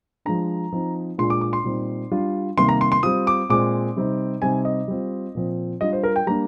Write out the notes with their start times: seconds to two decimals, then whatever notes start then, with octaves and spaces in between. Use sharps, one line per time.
0.25 F3 G#3 D4 A#5
0.72 F3 C4 D#4
1.18 A#2 G#3 D4 F4 C6
1.30 D6
1.41 D6
1.53 C6
1.64 A#2 G3 C4 D#4
2.11 G3 D4 F4
2.57 C3 D#3 G3 A#3 C6
2.69 A#5
2.81 C6
2.92 C6
3.03 G3 C4 F4 D#6
3.27 D6
3.49 A#2 G#3 C4 D6
3.96 C3 G3 C4 D#4
4.42 C3 G3 C4 D#4 G#5
4.65 D#5
4.88 G3 C4 F4
5.35 A#2 F3 C4
5.81 G3 D4 F4 D#5
5.93 C5
6.04 A#4
6.16 G5
6.27 G3 A#3 D4 A#5